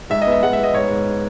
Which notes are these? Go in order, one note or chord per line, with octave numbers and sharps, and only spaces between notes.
G#2 E5
D#5
B3 E5
G#3 F#5
E5
B3 D#5
G#2 C#5
G#2